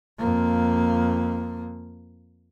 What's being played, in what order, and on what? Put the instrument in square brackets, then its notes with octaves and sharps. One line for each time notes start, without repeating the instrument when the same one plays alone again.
[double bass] F2 A#3